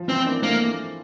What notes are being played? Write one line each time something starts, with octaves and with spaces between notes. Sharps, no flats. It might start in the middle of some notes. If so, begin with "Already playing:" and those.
Already playing: F3
E3 C4
A#3 D4
A3 A#3 C4